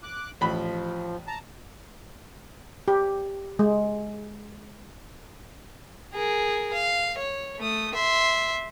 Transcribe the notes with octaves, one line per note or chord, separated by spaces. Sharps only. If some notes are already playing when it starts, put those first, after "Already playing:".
D6 F#6
A1 F3 B5
A5 A#5
G4
G#3
G#4 A#4
F5
C#5
A3 D#6
E5 C6